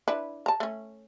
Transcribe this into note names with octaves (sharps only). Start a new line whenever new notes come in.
D4 E4 B4
A5 A#5
A3 C#4